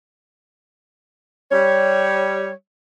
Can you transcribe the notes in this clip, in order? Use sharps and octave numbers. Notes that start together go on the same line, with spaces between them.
G3 C#5